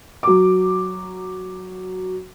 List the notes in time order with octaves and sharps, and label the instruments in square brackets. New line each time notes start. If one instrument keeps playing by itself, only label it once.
[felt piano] F#3 D6